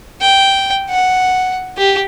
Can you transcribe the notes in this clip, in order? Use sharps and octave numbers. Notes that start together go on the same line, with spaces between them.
G5
F#5
G4